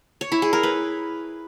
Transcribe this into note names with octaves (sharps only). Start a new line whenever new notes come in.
C#5
E4
G#4
A#4
B4